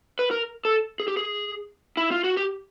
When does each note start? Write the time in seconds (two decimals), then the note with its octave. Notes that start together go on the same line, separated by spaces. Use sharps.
0.19 B4
0.31 A#4
0.65 A4
1.00 G#4
1.08 G4
1.17 G#4
1.97 E4
2.11 F4
2.24 F#4
2.37 G4